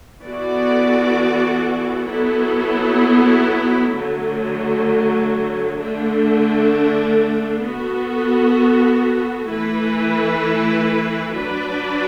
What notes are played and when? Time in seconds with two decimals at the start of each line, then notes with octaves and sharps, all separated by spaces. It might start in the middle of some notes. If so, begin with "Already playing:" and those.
0.22 E3 B3 F#4 A4 D5
2.09 F#3 B3 E4 A4
3.94 D3 F#3 A3
5.79 D3 A3 D4
7.65 B3 F#4 A4
9.50 E3 A3 E4 B4
11.35 F#3 D4 B4 D5